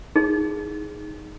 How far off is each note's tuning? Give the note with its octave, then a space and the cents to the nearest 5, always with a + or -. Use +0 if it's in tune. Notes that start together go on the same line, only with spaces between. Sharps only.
D#4 +0 G#4 +0